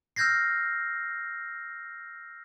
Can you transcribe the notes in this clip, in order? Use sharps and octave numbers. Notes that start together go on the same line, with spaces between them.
E6 F6 G6 G#6 A#6 C7